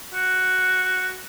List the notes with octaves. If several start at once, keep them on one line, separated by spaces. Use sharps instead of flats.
F#4